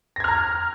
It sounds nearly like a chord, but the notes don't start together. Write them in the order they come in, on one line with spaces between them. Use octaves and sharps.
A#6 G#6 F6 A#5